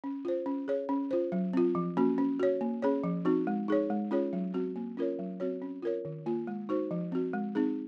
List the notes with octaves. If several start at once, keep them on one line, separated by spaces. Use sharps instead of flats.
C#4
F4 C5
C#4
G#4 C#5
C#4
F4 C5
F#3
C4 F4
F3
A#3 C#4 F#4
C#4
F#4 C#5
A#3
C#4 G#4 C#5
F3
C4 D#4 F#4
G#3
D#4 G#4 C#5
G#3
C#4 F4 G#4 C#5
F#3
C4 F#4
A#3
C#4 F4 A#4 C#5
F#3
C4 F#4 C#5
C#4
F4 A#4 C#5
D#3
A#3 F4
G#3
D#4 F#4 C5
F3
C4 F#4
G#3
C4 D#4 G#4